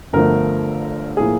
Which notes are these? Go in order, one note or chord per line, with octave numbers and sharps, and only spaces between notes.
G1 G2 D3 F3 A3 A#4
A2 F3 A#3 G#4